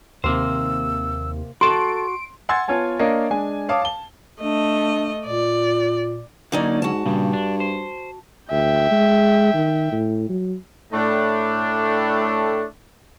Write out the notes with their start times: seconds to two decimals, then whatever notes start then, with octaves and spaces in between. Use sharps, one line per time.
0.24 D#2 C3 A#3 C5 E6
1.61 F#4 A4 A5 C6 D7
2.49 F#5 G#5 C6 E6 G#6 A6
2.68 B3 F4 C#5 G#5 A5
2.99 A#3 D4 A#4 C#5 D#5 F5
3.30 G#3 D4 G#5
3.69 C#5 F5 A5 D6 D#6
3.82 A5 G7
4.42 A3 D4 D#5
5.27 A#2 D5
6.52 D3 F#3 A#3 C#4 D#4 D5
6.82 G#2 F#4 A5
7.05 G2 A#2 C#3 G3
7.33 D4
7.60 C5
8.51 D2 E5 G5
8.91 G#3
9.54 D#3
9.92 A2
10.29 F#3
10.93 A2 A3 D4